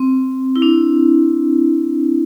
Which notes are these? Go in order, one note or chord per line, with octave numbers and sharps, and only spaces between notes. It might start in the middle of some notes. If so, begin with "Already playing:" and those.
Already playing: C4
E4
D4